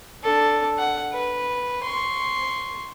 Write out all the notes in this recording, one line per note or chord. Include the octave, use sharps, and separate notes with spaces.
D4 A4
F#5
B4
C6 C#6